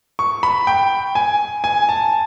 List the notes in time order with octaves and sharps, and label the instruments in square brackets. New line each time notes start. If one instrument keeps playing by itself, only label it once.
[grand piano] C#6
B5
G5
G#5
G#5
A5